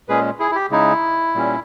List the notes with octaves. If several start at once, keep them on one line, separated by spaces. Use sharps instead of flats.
A#2 G#3 C#4 G#4 B4
E4 G#4
E4
G4
C#3 G#3 D#4 E4
A#2 G3 C#4